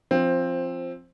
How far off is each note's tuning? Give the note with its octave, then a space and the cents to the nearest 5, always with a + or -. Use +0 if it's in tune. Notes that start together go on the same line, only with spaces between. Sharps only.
F3 -5 C4 +10